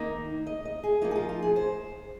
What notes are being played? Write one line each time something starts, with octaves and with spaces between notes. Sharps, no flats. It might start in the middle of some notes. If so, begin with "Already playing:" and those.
Already playing: D#3 A#3 D#4
D#5
D#5
G#4
F3 A#3 D#4 F4
G#4
F4
F4
G#4
C5